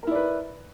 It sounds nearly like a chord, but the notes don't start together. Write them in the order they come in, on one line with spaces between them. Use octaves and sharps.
A#4 E4 D5 B4